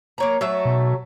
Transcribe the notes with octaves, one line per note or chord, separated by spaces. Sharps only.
A#3 C#5 A#5
F#3 A3 E5
B2